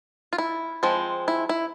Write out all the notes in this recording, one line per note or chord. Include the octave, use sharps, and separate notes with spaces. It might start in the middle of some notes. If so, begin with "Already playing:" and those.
F4
E4
F3 G#3 C4
E4
E4